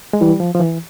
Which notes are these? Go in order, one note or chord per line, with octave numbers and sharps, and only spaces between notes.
G#3
E3 G3
F3
F3
E3